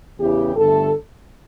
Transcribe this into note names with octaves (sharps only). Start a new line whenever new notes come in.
E2 C#3 E3 G4
G1 G2 D3 A3 A4